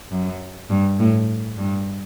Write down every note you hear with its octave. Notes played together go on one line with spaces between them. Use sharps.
F#2
G2
A2
G2